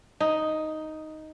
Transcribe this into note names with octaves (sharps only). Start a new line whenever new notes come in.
D#4